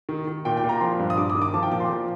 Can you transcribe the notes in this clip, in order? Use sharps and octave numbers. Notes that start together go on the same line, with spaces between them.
D#3
D#3
A#2 G5
G5
A#2
A#5
F3 C6
G2
D#6
G2 D6
D#6
D#3
D6
F3 A5
G5
A#2 D6
C6
F3